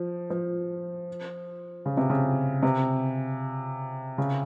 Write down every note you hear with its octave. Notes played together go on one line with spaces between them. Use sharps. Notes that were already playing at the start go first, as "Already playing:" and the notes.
Already playing: F3
F3
C#3
C3
C#3
C3
C#3